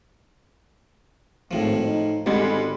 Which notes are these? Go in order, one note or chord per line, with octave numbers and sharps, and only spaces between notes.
G#1 A2 F3
D#4
G#1 D3 G3 G#3